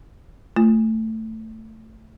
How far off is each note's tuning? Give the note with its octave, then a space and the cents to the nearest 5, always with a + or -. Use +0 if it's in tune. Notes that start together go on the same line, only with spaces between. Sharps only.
A3 +10 F4 -20